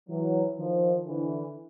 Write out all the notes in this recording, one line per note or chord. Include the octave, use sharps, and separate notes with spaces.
E3 F#3
D#3 F3
D3 E3